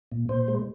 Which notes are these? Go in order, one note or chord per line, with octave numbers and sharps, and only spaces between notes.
A#2
A#2 C5
G#3